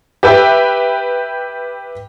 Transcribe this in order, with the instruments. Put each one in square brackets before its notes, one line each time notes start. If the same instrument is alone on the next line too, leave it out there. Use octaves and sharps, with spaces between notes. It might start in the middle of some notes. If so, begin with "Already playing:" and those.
[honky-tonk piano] G4 B4 E5 G5